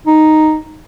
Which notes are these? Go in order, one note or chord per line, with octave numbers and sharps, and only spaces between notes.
D#4